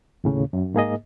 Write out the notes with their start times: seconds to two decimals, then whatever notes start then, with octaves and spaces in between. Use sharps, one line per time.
0.24 D#2 A2 C#3
0.53 F#2
0.74 G#2 A#3 G#4 D#5